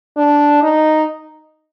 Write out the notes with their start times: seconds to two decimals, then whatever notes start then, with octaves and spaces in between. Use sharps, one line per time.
0.17 D4
0.63 D#4